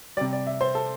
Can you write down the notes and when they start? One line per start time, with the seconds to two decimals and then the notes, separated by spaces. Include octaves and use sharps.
0.17 C3 G3 D5
0.33 D5
0.47 E5
0.61 C5
0.75 A4